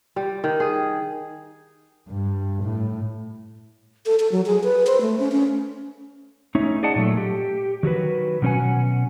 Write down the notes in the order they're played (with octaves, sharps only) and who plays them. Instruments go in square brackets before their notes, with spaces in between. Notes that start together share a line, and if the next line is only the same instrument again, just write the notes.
[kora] G3
D#3
G#4
[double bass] G2
A2
[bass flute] A4
A4
F#3
G#4
B4
C5
A3
C#4
C#4
[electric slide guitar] A3 C#4 D#4 C#5 E5
G#4 D5 D#5 F#5 A5
A#2 F#3 A3
G4
D#3 F#3 F#4 B4
B2 F#3 C#4 C5 F#5 G#5